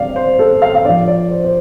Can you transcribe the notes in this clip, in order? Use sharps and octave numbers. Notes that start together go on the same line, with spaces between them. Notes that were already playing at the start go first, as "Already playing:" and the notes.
Already playing: D3 G3 C4 D5 F5
C5
A4
F5
F5
F3 D4 D5
D5
C5
C5